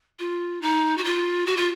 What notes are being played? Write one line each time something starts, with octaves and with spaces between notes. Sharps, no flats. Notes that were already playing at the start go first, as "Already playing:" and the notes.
F4
D#4
F#4
F4
F#4
F4